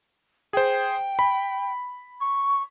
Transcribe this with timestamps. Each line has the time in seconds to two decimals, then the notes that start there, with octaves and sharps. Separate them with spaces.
0.53 G#4 C5 G5
1.19 B5
2.20 C#6